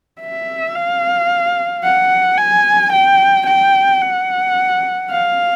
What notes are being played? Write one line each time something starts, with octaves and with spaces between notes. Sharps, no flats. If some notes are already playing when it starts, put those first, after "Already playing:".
E5
F5
F#5
G#5
G5
G5
F#5
F5